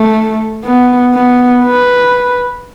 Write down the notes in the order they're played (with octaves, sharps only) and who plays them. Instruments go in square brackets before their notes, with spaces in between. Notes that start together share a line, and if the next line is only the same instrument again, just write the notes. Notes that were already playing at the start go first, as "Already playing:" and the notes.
Already playing: [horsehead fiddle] A3
B3
B3
B4